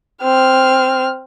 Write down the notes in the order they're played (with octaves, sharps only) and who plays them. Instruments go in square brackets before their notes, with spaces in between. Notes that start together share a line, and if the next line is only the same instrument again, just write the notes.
[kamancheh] C4 F6